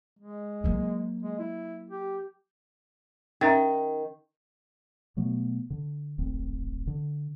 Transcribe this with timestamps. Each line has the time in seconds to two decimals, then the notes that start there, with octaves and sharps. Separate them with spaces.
0.19 G#3
0.64 F#3 A#3
1.23 G#3
1.39 E4
1.90 G4
3.41 D#3 C#4 E5 A#5
5.17 B2 F#3 A3 B3
5.70 D3
6.18 D1 G#1 D2 C4
6.87 D3